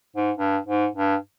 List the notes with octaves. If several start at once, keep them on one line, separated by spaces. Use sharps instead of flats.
G#2
G2
G#2
G2